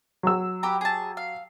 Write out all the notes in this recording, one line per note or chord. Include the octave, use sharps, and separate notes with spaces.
F#3 E6
G4 B4 A#5
G#4 A5
F5